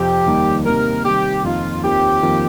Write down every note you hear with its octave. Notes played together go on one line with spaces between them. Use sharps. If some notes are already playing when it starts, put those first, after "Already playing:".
Already playing: F2 C3 F3 C4 G4
D#2 D#3 G3 A#3 D#4
C3 D#3 A#3 D#4 A#4
C3 D#3 G3 G4
F2 D#3 A#3 D#4 F4
D#2 D#3 C4 F4 G4
F2 D#3 A#3 F4